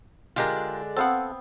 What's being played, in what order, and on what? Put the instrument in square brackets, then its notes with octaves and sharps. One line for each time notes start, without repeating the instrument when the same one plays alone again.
[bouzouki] D3 G#3 D4 [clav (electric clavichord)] F4 G4 A#4
[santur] B3 C4 [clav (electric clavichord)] A4 F5 F#5